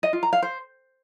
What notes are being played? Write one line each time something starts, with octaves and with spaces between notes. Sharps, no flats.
D#5
F4
A#5
F5
C5